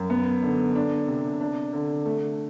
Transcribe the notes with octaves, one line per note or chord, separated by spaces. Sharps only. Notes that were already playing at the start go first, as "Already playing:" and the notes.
Already playing: F#2
B3
D3
D4
C3
D4
D3
A3